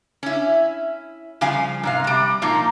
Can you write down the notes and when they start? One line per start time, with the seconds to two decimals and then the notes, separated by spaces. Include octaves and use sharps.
0.23 C#4 E4
1.41 C#3 F3 G3 F5 G#5
1.83 G#2 C3 F5
2.04 C3 G3
2.42 A#2 F3 A#3 D#4 F4